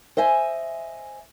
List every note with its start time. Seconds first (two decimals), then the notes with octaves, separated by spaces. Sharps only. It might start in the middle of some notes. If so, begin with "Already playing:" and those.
0.17 C5 D#5 E5 G#5